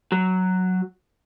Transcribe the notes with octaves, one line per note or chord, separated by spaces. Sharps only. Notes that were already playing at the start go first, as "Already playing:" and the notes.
F#3